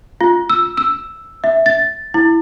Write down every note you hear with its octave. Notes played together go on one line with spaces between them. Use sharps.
F4
E6
E6
E5
A6
E4